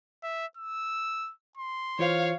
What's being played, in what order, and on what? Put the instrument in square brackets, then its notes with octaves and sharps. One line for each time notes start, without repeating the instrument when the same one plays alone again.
[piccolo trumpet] E5
E6
C6
[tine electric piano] E3 F4 C5 [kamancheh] C#5 F5